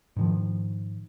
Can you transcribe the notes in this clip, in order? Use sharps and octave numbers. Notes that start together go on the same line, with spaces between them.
G#2 D#3 F3